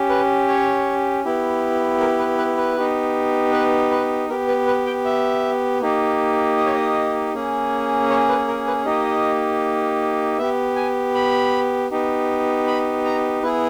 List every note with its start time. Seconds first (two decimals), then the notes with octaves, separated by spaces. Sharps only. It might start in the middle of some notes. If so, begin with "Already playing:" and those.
Already playing: C#4 G4
0.09 B4
0.48 C#5
1.24 B3 E4 G4
2.00 A#4
2.19 B4
2.38 B4
2.57 B4
2.76 B3 D#4 G4
3.52 B4
3.91 B4
4.29 B3 G4 A#4
4.48 B4
4.67 B4
4.86 G5
5.05 E5
5.81 A#3 D#4 G4
6.57 D#5
6.66 C#5
6.74 D#5
7.34 A#3 C#4 G#4
8.10 C#5
8.29 B4
8.48 A#4
8.67 B4
8.86 A#3 D#4 G4 D#5
10.38 B3 G4 E5
10.76 G#5
11.14 B5
11.90 B3 D#4 G4
12.67 B5
13.05 A#5
13.43 B3 E4 G#4 B4